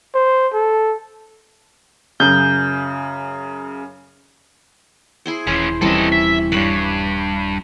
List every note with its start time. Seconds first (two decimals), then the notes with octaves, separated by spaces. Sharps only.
0.15 C5
0.53 A4
2.20 F#2 C#3 G6
5.26 E4 G#4 C5
5.47 D#1 E3 C#4 C5
5.81 D#1 G#1 C3 E3 G3 C#4 A4 D#5
6.12 E5
6.52 E2 G2 B4 C#5